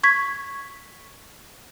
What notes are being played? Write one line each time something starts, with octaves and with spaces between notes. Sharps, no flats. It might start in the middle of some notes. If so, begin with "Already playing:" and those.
C#6 G#6 B6